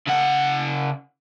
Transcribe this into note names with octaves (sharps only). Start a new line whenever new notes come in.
C#3 F#5